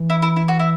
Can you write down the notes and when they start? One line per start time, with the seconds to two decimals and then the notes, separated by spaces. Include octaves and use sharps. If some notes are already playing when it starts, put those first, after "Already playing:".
Already playing: E3
0.10 E4
0.22 E4
0.36 E4
0.48 F#4
0.60 E4